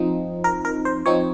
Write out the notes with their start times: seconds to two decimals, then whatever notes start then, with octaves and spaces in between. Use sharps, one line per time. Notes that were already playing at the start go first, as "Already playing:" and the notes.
Already playing: F3 C4 D#4
0.44 A#4
0.65 A#4
0.85 C5
1.06 F3 C4 D#4 C#5